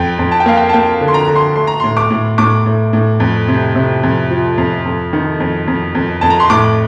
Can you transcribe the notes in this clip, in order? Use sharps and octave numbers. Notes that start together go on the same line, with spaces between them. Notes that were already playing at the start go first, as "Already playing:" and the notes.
Already playing: F2 G5
F2
A5
G5
A#3 F5
G5
A5
A#3 G5
D3
C6
A#5
D3 A#5
C6
A3 C6
A#5
C6
A2
D6
A2
A2 D6
A2
A2
F2
C3
C3
F2
F3
F2
F2
D#3
F2
F2
F2
F2 A5
A#5
C6
A2 D6